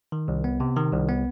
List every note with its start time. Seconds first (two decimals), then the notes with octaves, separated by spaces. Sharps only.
0.12 D#3
0.28 C2
0.44 B3
0.60 C3
0.76 D#3
0.92 C2
1.08 B3